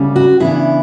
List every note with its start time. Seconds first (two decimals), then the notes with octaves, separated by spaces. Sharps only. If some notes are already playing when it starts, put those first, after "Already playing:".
Already playing: D2 C#3 G3 C#4
0.16 F#4
0.40 C#3 E3 B3 D4 E4